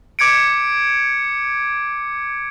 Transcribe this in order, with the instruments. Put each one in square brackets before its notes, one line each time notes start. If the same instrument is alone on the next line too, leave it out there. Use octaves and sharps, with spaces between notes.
[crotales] D6 G#6 C#7 D7